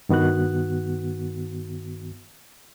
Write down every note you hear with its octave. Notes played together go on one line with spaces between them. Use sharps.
G2 D#3 B3 F#4 F#6